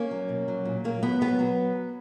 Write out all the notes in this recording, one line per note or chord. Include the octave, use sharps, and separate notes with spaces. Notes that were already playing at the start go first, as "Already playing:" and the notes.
Already playing: A#3 C#4
F#3
B2
F#3
A#2
F#3 A#3
F#3 B3
F#3 B3
F#3